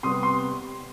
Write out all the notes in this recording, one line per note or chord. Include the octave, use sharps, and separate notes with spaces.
C3 G3 B3 C6 D#6
C6